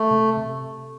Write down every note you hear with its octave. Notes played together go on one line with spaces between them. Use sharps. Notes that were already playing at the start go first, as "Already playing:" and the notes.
Already playing: A3
C3
C3